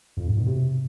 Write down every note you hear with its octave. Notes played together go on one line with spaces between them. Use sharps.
F2
G#2
B2
C3